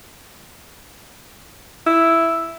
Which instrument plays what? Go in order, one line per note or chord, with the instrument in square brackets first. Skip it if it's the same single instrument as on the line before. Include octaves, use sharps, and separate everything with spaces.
[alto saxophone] E4 [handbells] E6